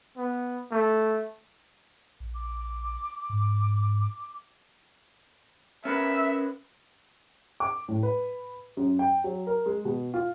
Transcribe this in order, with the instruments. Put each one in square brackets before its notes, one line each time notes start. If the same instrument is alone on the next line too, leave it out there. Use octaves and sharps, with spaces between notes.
[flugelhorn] B3
A3
[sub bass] A#1
[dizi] D6
[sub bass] G#2
[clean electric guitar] C#4 A#4 B4 [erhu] E5
[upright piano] D6
A2
B4
F#2
G5
F#3
A#4
G#3
B2
F4